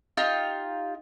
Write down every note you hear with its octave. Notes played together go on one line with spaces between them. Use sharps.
D#4 F4 G4 F5